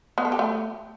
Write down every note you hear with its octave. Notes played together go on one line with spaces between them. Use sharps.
B3
A4
G4
A3